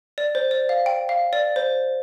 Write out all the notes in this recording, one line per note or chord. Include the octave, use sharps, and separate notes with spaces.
D5
C5
D5
F5
G5
F5
D5
C5